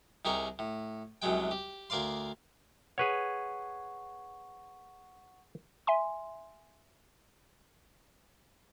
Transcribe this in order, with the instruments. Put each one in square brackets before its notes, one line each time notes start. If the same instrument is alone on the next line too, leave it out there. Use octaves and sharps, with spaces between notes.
[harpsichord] C2 D#4 G4 G#4 A#4 C#6
A2
C2 F#2 F#3 G#3 G5
G4
D2 A#4 D5 F5 C6
[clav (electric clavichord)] G#4 B4 C#5 [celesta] F#5 C#6
[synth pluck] E5 G#5 C6